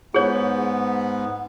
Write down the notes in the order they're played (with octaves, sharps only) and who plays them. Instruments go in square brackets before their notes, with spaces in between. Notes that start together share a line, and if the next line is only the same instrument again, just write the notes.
[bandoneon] G#2 B3 [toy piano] G#4 C#5